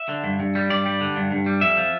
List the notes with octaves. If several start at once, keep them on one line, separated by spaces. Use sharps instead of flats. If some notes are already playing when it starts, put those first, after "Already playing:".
Already playing: E5
D3
G2
G2
G3
G2 D5
G3
D3
G2
G2
G3
F2 E5
F3